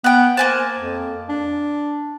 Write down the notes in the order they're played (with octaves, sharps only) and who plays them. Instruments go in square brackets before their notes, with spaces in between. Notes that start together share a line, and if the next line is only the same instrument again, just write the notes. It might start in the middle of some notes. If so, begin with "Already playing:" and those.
[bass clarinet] B3 [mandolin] F#5 G5
[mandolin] A#3 G#5 A5 [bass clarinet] C5
[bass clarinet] F2
D4